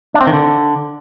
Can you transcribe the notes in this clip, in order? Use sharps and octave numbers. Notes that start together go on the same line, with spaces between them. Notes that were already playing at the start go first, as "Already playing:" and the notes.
D4
C4
D#3
D3